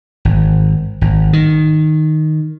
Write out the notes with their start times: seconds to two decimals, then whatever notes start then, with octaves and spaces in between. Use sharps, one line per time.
0.25 G#1
1.01 G#1
1.33 D#3